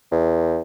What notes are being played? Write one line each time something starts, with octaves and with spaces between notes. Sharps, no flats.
E2